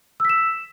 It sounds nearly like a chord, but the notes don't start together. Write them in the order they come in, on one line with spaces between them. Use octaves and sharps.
E6 B6 E7